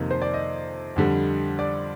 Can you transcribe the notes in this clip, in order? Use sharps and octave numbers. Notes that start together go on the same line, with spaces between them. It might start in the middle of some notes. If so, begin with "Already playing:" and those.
Already playing: F2 C3 D#3 A#3 D#5
C5
D5
D#5
F2 D3 G3
D5